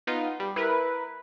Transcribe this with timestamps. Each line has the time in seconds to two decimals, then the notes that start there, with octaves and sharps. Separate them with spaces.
0.07 B3 D#4 F4
0.40 G3
0.56 E4 A#4 B4